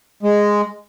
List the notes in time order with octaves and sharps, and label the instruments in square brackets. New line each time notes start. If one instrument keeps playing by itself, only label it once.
[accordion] G#3